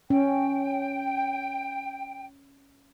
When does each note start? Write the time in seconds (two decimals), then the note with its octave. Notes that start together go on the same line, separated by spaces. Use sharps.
0.10 C#4 G5